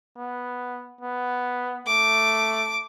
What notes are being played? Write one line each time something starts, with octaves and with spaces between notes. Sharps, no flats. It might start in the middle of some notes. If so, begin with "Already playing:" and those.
B3
B3
A3 D6